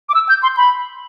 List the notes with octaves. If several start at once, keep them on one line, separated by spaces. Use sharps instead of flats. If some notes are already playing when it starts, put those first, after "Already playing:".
D6
E6
G6
C6
B5